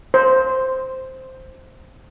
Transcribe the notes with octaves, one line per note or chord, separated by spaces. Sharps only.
C5